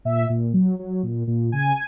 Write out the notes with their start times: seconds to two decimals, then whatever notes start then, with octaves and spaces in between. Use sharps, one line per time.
0.05 A#2 E5
0.29 A#2
0.54 F#3
0.79 F#3
1.03 A#2
1.27 A#2
1.52 C#3 G#5